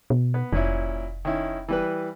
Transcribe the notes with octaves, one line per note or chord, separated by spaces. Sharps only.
B2
B3
F1 A#2 C#4 E4
D#3 C#4 E4
E3 G3 B4